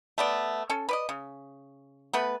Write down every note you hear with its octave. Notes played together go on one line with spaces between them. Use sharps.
A3 B3 D5
C#4 A4
B4 D5 D#5
C#3
A3 B3 B4